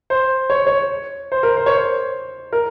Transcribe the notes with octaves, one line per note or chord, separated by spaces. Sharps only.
C5
C#5
C#5
C5
A#4
C5
C#5
C5
A#4